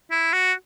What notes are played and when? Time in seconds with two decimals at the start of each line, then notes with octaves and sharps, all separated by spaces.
0.11 E4
0.33 F#4